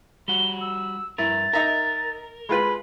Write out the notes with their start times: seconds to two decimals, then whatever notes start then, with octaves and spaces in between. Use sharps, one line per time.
0.28 G3 F#4 G7
0.61 E6
1.18 G2 E4 A#4 A6
1.53 D#4 A#4 E5 A#5
2.49 G#3 F4 B4 B5